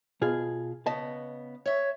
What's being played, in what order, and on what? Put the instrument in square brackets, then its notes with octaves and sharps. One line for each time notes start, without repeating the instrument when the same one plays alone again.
[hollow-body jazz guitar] B2 F4 G#4
[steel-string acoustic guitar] C#3 B3 [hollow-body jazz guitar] D#5 A5
[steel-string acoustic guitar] C#5 E5